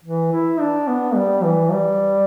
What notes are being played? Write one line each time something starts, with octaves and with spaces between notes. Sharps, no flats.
E3
E4
D4
B3
G3
E3
G3